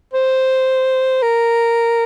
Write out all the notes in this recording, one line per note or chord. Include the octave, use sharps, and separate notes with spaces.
C5
A#4